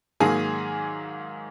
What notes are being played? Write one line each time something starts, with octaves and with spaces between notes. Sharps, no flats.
G#2 D#3 F#3 A#3 G#4 G#5